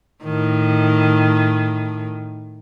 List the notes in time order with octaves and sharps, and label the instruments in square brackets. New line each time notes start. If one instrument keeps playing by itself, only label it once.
[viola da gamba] A2 D#3